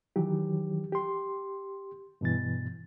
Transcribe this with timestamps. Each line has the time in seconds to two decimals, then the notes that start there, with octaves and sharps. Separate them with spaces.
0.16 D#3 E3 F#3 G4
0.92 G4 C6
2.21 G2 B2 E3 A6